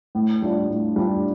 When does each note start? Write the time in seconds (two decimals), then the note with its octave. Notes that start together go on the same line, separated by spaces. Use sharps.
0.15 A2
0.42 G3 D4 F4
0.69 A2
0.96 G3 D4 F4